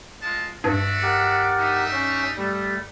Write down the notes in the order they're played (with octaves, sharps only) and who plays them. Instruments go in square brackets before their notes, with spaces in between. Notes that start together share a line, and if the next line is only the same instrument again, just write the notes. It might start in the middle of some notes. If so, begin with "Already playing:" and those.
[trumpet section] G#3 F4 A5
[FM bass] G2 [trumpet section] F#4 D5 E5
[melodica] G4 A#4 F#5
[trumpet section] G3 D#4 E5
[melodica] C#4
[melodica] G3 [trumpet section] A3